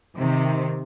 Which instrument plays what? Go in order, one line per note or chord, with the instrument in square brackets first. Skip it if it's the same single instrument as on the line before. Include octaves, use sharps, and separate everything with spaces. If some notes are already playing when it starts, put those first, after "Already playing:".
[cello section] C3 D#3